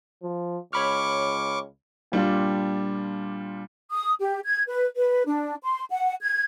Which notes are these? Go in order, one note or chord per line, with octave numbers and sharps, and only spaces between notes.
F3
C#2 C#5 B5 C#6 D6 F6
A#2 G3 D4 F4
D#6
G4
G#6
B4
B4
D4
C6
F#5
G#6